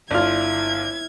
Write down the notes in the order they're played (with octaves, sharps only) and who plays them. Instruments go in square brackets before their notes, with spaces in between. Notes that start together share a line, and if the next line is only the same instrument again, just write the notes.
[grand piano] G1 F6 [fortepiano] D4 F4 [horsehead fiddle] E4 [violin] G#6